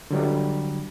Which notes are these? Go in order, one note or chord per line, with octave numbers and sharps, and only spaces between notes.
D3 F#3 G3